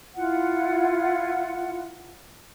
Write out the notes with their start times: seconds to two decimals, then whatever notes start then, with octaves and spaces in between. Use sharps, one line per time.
0.16 E4 F4 F#5